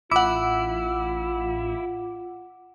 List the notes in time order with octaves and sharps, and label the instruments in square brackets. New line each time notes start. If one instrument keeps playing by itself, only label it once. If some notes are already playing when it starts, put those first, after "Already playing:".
[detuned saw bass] A1 [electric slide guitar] E4 [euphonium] F4 [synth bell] F#5 D6